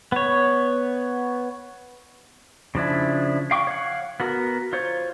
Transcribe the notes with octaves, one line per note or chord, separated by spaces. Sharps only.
B3 C#5
C#3 F3 D4 E4
F5 G5 C#6 D6
C#5 F5 F#5
B3 F#4 A#4
F4 C5 C#5